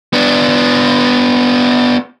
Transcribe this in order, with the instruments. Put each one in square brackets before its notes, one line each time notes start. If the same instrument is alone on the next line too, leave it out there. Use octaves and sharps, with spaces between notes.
[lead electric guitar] B3 D4